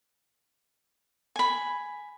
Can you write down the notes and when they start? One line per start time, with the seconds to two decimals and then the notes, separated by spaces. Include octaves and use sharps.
1.36 G#5 B5